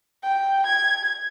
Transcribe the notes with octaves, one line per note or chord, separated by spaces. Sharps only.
G5
G#6